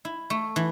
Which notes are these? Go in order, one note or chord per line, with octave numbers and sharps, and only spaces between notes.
E4
A3
E3